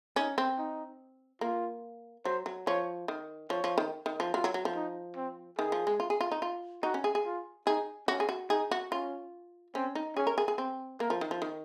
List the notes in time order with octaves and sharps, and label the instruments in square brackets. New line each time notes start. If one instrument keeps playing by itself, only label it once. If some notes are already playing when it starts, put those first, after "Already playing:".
[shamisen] C#4 [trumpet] D#4
[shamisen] C4
[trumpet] D#4
[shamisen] A#3 [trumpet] F4
[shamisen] F#3 [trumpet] C5
[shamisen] F#3
[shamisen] F3 [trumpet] C#5
[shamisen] D#3
[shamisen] F3 [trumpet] C#5
[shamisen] F3
D#3
D#3
F3
[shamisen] F#3 [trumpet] F4
[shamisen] F#3
F#3
F3
[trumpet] D#4
C4
[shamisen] D#3 [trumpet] G#4
[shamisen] F3
G#3
F4
G#4
F4
D#4
F4
[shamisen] D#4 [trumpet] F#4
[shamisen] C#4
G#4
G#4
[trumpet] F4
[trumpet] D#4 [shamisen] G#4
[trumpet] C#4 [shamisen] F#4
[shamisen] G#4
F#4
[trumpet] D#4 [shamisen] G#4
[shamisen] F#4
[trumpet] C#4 [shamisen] F4
[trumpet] C4 [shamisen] C#4
[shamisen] D#4
[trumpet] C#4 [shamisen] G#4
[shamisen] A#4
G#4
G#4
C4
[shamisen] A#3 [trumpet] A#4
[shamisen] F3
D#3
F3
D#3